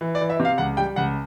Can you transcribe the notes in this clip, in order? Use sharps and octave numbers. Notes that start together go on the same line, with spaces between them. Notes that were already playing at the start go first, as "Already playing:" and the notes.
E3
D5
E3
E5
C3
F5
C#2 F#5
G3 G5
C#2 F#5